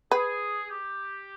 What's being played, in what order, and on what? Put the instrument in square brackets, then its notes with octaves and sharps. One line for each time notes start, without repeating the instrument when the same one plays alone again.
[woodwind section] G#4 [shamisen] B4
[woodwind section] G4